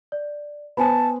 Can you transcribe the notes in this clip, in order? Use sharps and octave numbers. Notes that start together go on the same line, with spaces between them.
D5
B3 C5 G#5 A5 B5